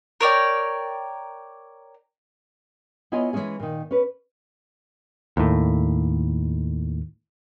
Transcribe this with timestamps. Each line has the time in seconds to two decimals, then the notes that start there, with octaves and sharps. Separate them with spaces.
0.21 A#4 C#5 D5 G5
3.12 B3 E4 F4 C#5 D#5 G#5
3.33 E3 F#3 G#3 C#4 G#4
3.60 A#2 D#3
3.91 C#4 B4
5.37 D#2 A2